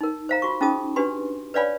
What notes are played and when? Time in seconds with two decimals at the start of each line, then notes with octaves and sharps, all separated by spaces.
0.01 D#4 A#4
0.29 C5 F5 A#5
0.42 F4 F#4 C#6
0.61 C#4 D#4 F4 G#4 A5 D#6
0.96 D4 F#4 G4 B4 G#5 C6
1.54 B4 C#5 D5 F5 G#5 B5